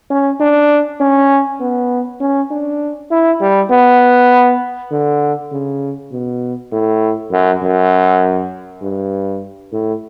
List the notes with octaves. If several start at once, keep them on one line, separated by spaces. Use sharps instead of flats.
C#4
D4
C#4
B3
C#4
D4
E4
G3
B3
D3
C#3
B2
A2
F#2
F#2
G2
A2